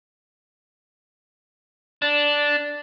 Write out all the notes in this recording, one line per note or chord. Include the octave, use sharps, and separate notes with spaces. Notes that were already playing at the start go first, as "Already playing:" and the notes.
D4